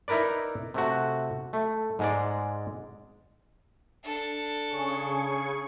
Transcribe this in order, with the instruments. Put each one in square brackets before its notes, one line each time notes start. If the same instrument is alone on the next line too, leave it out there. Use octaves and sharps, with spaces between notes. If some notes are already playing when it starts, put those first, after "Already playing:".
[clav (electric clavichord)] D#4 E4 A#4 B4 D5
C3 A3 F#4
A3
G#2 G#3 D5
[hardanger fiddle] D4 A4
[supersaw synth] C#3 G#4 C#6